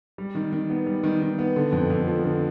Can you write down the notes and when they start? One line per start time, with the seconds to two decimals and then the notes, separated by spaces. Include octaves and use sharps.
0.18 G3
0.35 D#3
0.52 D#3
0.70 B3
0.86 G3
1.04 D#3
1.22 D#3
1.39 B3
1.56 D3
1.72 F2
1.90 F2
2.08 F3
2.24 D3